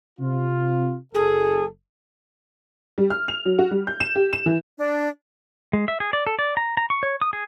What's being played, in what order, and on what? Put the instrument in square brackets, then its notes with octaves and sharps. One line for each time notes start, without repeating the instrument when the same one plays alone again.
[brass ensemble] C3 F4
[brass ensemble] F#1 A4 [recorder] G#4
[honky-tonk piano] G3
F6
F7
F#3
F#4
G3
G6
E7
G4
E7
E3
[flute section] D4
[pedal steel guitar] G#3
E5
G#4
D5
A4
D5
A#5
A#5
C#6
C#5
D#6
G#4